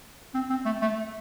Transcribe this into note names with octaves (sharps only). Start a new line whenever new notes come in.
C4
C4
A3
A3